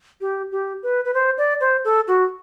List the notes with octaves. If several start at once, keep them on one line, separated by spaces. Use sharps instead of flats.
G4
G4
B4
B4
C5
D5
C5
A4
F#4